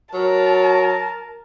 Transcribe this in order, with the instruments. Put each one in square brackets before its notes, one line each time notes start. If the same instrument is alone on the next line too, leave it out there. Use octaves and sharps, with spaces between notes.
[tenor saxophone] F#3 [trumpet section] A#4 [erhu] A5